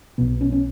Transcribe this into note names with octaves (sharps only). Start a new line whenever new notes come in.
B1 B2 B3
C#4
C#4